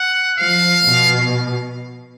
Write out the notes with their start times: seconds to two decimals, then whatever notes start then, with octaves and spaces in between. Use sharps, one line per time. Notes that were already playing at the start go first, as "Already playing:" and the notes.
Already playing: F#5
0.37 F3 F5
0.84 B2